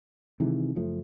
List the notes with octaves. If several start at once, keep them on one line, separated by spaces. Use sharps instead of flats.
C3 D#3 E3 G#3
F#1 F3 A3